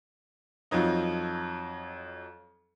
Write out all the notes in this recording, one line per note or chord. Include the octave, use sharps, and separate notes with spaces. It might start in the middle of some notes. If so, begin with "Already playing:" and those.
F2 F3 F#3 D#4